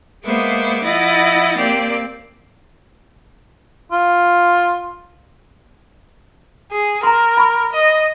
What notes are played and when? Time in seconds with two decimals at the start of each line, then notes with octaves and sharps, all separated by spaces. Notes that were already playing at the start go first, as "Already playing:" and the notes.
0.24 G#3 A#3 B3 C5 E5 D6
0.83 F3 E4 D#5 F#5 A6 A#6
1.56 A#3 C4 G4 D5
3.92 F4
6.72 G#4
7.03 A#4 A#5 C6
7.37 B5 C#6
7.73 D#5